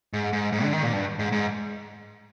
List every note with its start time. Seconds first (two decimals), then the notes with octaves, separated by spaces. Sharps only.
0.13 G#2
0.33 G#2
0.52 G#2
0.63 D3
0.73 D#3
0.83 A#2
0.93 G2
1.19 G#2
1.32 G#2